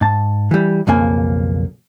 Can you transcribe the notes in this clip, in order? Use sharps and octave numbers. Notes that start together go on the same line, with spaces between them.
G#2 A5
E3 G3
B1 F2 C#3 A#3 G#5